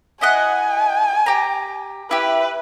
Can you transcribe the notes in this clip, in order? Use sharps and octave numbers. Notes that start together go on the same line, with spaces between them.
E4 D#5 F#5 G#5
G4 A#5
E4 G4 B4